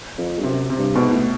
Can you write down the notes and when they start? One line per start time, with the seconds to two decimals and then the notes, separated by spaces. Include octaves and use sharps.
0.18 F2
0.39 G2
0.43 F#2 C3
0.70 C3
0.79 G2
0.95 G#2 B2
1.14 A2